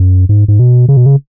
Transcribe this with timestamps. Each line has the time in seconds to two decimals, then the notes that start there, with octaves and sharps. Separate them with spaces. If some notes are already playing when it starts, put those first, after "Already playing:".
Already playing: F#2
0.29 G#2
0.48 G#2
0.59 B2
0.89 C#3
0.97 B2
1.06 C#3